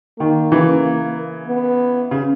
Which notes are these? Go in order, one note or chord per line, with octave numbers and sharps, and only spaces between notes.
D#3 A#3
C#3 E3
B3
C#3